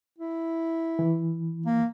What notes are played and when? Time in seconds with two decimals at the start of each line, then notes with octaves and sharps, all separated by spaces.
0.18 E4
0.99 E3
1.66 A#3